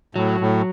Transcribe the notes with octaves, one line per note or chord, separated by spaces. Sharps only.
A2 F#3
A2